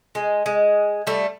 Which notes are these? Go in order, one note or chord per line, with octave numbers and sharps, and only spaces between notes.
G#3
G#3
G3 A3